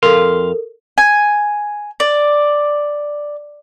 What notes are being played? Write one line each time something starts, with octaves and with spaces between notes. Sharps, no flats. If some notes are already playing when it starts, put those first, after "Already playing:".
F2 A4 A#4 F5 C6
G#5
D5